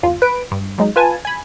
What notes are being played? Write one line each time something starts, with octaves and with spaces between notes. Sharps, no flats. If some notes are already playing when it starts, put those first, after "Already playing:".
G1 E2 F4
B4 D7
G2
F#2 G#3 D#4
F4 B4 G#5 A5
G#5 B5